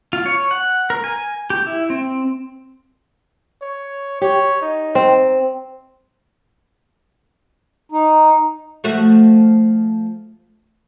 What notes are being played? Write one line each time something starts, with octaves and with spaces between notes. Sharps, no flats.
F4
C#5
F#5
A#4
G#5
G4
E4
C4
C#5
G4 C#5
D#4
C4
D#4
F3 A3 F#4